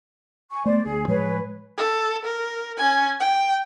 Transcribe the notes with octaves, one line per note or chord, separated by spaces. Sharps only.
G#5 C#6
A3 B3 C5 D5
D2 G#4
A2 F3 G#3 G#4 B4 C#5
A4
A#4
C#4 G#5
G5